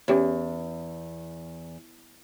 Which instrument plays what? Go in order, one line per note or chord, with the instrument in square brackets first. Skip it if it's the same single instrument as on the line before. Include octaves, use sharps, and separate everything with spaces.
[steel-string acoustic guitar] E2 [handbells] C#4 G4 C#5